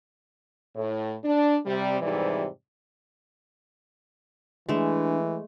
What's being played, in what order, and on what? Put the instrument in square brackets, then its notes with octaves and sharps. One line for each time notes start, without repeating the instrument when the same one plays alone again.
[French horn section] A2
D4
C3 G3
F2 G#2 C3 E3 G3 D5
[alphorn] E3 [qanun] G#3 A3 [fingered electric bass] D4